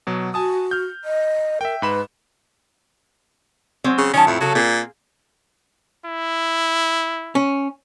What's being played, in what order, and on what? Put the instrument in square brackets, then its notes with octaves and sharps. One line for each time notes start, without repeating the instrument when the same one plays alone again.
[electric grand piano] B2 F#3
[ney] F#4 [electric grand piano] G#5 A5 D#6
[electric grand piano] F6 G6
[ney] D#5
[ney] A#4 [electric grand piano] E5 G5
[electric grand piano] G#2 B5 E7 [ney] B4
[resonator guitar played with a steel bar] F#3 G#3 C4
[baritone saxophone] C#3
[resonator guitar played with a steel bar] D#3 F#3 A5 [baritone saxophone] C#4
[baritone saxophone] F2 [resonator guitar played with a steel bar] A2 E4
[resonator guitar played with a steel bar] C#3 A4 [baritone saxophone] F#3
[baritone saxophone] A#2 [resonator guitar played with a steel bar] A#3 C4 G#4
[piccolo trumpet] E4
[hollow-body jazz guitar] C#4